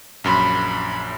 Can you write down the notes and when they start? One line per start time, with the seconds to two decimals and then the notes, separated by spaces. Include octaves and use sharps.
0.24 A#1 F#2 B5 C6